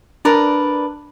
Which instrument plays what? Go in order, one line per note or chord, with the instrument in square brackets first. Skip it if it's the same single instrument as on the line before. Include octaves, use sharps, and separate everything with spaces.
[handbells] D4 [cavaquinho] A#4 B4 D5